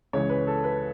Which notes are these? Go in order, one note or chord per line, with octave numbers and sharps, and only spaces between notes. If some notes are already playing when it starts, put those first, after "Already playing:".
C#2 C#3 E3 C#5
B4
A4
B4